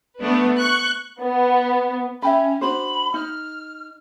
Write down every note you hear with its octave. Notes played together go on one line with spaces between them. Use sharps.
A3 B3 D4 B4
C#6 F#6
B3
C#4 E5 G5 B5
D4 F#4 C5 B5
D#4 F6